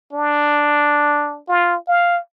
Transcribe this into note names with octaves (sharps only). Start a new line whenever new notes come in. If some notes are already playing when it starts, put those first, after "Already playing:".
D4
F4
F5